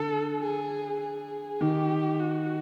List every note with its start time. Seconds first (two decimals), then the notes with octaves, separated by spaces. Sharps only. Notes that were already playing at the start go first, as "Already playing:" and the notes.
Already playing: D3 A4
0.42 G#4
1.01 G#4
1.61 D#3 G4
2.20 F#4